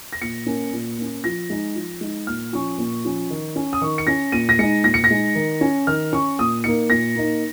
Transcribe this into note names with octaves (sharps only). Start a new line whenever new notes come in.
A#6
A#2 C#7
A#3 C#4
A#2
A#3 C#4
F3 A#6
G#3 D#4
F3
G#3 D#4
A#2 F6
F3 C#4 C#6
A#2
F3 C#4
D#3
C#4
D#6
D#3 C#6
C#7
C#4 A#6
A#2 D#7
A#6
G#3 D#4 C#7
A#2 A#6
C#7
A#6
G#3 D#4
D#3
C#4
D#3 F6
C#4 C#6
A#2 D#6
A#3 D#4 C#7
A#2 A#6
A#3 D#4